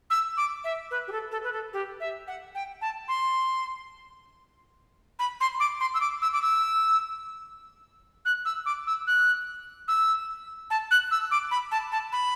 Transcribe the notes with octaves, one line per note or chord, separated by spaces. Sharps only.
E6
D6
E5
B4
G4
A4
A4
B4
A4
G4
E5
F#5
G5
A5
C6
B5
C6
D6
C6
E6
D6
E6
D6
E6
F#6
E6
D6
E6
F#6
E6
A5
F#6
E6
D6
B5
A5
A5
B5